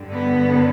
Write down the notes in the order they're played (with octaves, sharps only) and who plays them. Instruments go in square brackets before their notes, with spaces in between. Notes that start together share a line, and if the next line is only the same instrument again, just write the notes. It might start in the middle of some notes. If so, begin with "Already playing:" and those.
Already playing: [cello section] G2 D3 G3
B3